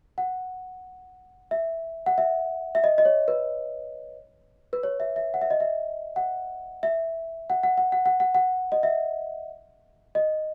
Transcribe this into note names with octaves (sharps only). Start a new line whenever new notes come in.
F#5
E5
F#5
E5
E5
D#5
D#5
C#5
B4
B4
C#5
E5
E5
F#5
E5
D#5
E5
F#5
E5
F#5
F#5
F#5
F#5
F#5
F#5
F#5
D#5
E5
D#5